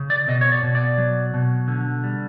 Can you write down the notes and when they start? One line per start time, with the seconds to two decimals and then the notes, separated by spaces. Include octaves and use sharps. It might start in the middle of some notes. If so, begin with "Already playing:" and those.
Already playing: C#3
0.10 D5
0.28 B2 D#5
0.41 C#5
0.52 D5
0.63 B2
0.75 D5
0.98 F#3
1.34 B2
1.68 D3
2.04 G3